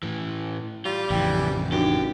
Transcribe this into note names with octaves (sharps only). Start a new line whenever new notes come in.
A2 E3
G3 F4
A1 F2 C#3 E3 E4 G5
F#2 D4 D#4 G4